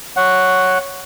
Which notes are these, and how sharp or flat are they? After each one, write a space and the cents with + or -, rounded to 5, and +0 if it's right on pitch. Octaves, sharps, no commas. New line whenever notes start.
C#5 +0 F#5 +0